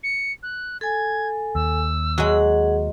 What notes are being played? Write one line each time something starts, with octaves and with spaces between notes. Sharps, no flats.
C#7
F#6
A4 G#5 G#6
D#2 E6
F#3 G#3 G#4 F#5